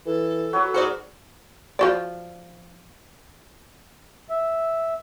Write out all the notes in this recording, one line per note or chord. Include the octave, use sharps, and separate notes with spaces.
E3 A4
F#3 F#4 B4
G#2 F#4 A#4 C5 D5 D#5
F3 F#4 D5
E5